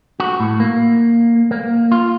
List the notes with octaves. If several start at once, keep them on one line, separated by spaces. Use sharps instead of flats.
F#4
A2
A#3
A#3
F4